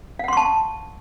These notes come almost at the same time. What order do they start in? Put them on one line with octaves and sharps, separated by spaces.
F5 F#5 C6 C#6 A5